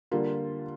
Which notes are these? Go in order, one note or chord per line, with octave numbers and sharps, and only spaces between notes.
D3 G3 A#3 F4